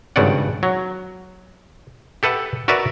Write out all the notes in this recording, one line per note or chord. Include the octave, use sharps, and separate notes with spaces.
G#1 G2 C#3 C4 D5 F#5
F#3
G4 A4 B4 E5 F#5
F#4 A#4 B4 D5 E5